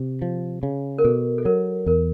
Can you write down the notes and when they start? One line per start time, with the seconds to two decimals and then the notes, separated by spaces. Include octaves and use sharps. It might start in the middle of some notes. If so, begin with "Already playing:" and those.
Already playing: C3
0.22 F3
0.63 C#3
0.98 A#4
1.04 B2 A4
1.38 A4
1.45 F#3 A#4
1.86 E2 A#4